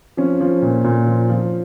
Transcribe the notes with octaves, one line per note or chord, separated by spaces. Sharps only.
F3 C#4
F3
A#2
A#2
F3
F3